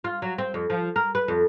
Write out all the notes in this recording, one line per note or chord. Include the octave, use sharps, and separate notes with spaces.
F4
F#3
C4
F2
F3
A#4
B4
F2